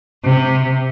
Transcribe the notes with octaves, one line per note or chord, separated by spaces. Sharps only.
C3